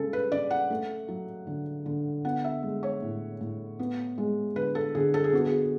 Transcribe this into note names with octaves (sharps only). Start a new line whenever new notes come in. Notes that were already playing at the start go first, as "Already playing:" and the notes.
Already playing: C#3 G#3 A4
B4
C#3 D5
F#5
A3
F#3
D3
D3
B3 F#5
E5
G#3
C#5
A2
A2
B3
G#3
D3 B4
A4
D3 G#4
A4
G#4
B3 F#4
G#4